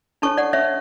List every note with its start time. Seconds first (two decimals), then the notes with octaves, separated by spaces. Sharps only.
0.22 D4 A4 C#5 A5 C#6
0.37 D5 F#5
0.53 C#5 E5